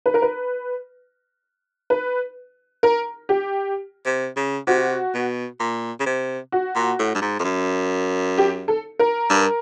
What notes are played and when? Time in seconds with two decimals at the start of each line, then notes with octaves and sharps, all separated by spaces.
0.06 B4
0.14 A#4
0.22 B4
1.90 B4
2.83 A#4
3.29 G4
4.06 C3
4.36 C#3
4.67 C3 F#4
5.14 B2
5.60 A#2
6.00 C#3
6.06 C3
6.52 F#4
6.75 A#2
6.99 A2
7.15 G2
7.21 G#2
7.39 F2
7.44 F#2
8.38 G4
8.68 A4
8.99 A#4
9.30 G2